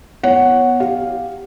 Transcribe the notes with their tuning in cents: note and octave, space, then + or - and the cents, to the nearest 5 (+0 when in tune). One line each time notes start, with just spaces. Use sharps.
B3 +0 C#5 -5 F#5 +0
G4 +0 F5 +0